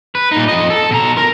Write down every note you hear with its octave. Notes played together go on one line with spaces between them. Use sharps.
B4
A#2 D#4
F2 D#5
A4
B2 A#5
A#4